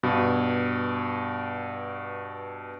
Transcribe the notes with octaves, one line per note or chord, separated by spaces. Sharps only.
G2 B2